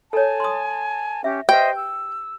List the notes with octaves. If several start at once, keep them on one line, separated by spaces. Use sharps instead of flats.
A4 C#5 G#5 A5
C6 D#6
C#4 G4 E5
G4 B4 C5 D#5 E5 G5
E6